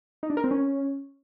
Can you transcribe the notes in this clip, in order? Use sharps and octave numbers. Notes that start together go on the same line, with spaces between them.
D#4
D4
A#4
C4
C#4